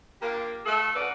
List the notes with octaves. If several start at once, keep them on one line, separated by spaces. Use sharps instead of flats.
A#3 D4 F4 G4
A3 F4 A4
C#4 D#4 F#4 B4 D5